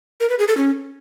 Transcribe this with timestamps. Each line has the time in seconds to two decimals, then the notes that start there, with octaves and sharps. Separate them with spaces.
0.20 A#4
0.30 B4
0.39 G#4
0.48 A4
0.57 C#4